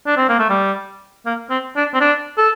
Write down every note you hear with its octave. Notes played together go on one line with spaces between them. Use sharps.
D4
C4
A#3
A3
G3
A#3
C4
D4
C4
D4
A4